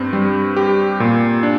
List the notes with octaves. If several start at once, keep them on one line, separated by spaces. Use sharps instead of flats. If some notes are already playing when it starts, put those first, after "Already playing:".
Already playing: G2 C4
G3
G4
A#2
D4